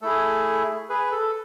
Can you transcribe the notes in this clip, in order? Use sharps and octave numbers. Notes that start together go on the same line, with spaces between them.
A3 E4 G#4 A4
G#4 B4
A4